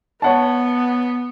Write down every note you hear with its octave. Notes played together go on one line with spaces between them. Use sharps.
B3 C#5 F#5 A5